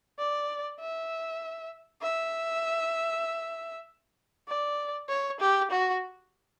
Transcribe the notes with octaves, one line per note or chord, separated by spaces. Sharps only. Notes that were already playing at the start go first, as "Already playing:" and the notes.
D5
E5
E5
D5
C#5
G4
F#4